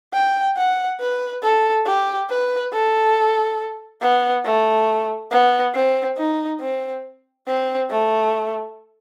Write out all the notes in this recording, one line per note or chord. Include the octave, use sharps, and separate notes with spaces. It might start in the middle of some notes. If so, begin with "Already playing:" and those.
G5
F#5
B4
A4
G4
B4
A4
B3
A3
B3
C4
D#4
C4
C4
A3